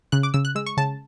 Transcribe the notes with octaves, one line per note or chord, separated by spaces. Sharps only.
C#3 F#6
D6
C#3 E6
F#6
G#3 E6
C#6
C#3 A5